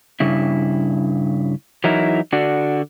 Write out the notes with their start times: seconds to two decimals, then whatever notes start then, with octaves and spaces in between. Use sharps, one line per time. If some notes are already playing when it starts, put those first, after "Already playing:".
0.20 G2 C#3 E4
1.84 E3 F#3 D#4 E4 A#4
2.33 D3 D4 F#4